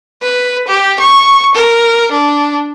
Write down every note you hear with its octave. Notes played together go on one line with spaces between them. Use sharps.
B4
G4
C#6
A#4
D4